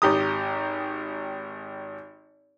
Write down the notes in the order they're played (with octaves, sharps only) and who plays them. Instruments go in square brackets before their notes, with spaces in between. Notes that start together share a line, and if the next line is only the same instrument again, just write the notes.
[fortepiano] G#1 G4 A#5 D#6